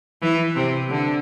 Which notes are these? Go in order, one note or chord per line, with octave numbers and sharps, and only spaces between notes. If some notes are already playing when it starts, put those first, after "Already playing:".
E3
C3
D3